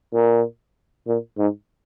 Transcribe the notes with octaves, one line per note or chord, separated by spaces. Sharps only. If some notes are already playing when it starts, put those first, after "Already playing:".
A#2
A#2
G#2